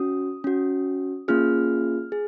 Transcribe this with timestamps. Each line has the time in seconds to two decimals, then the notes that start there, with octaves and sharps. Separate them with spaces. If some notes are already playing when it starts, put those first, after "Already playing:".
Already playing: C#4 F#4 D#6
0.44 C#4 F#4
1.28 A#3 C#4 F4 G#4 F6
2.12 G#4